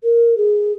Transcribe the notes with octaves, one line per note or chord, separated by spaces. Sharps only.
A#4
G#4